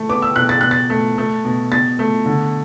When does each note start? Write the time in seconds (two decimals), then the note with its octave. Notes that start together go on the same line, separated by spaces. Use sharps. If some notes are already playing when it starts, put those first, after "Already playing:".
Already playing: A3
0.09 B3 D6
0.22 E6
0.36 B2 F#6
0.49 A6
0.61 B2 F#6
0.71 A6
0.90 A3
1.18 A3
1.45 B2
1.72 B2 A6
1.99 A3
2.26 D3